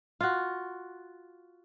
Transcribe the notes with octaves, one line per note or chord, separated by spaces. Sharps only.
F4 F#4